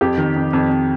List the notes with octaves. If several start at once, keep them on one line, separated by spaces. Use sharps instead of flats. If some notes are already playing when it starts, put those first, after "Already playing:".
F2 G4
D#3
F2
F2
F2